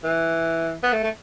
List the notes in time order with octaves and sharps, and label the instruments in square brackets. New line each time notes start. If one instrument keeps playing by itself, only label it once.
[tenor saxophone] E3
B3
A3
A3